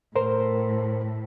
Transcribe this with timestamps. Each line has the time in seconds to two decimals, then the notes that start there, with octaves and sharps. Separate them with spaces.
0.16 A2 A#4 C5